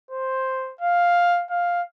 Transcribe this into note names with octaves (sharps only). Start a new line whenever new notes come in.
C5
F5
F5